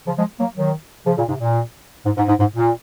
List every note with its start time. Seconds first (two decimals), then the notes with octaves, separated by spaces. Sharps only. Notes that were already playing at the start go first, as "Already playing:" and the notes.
0.07 C#3 F3
0.18 F3 G#3
0.40 F#3 A#3
0.56 D#3 F#3
1.06 C#3 F3
1.18 A#2 C#3
1.28 G#2 C3
1.40 A#2
2.06 G#2
2.17 G#2
2.28 G#2
2.40 G#2
2.56 A#2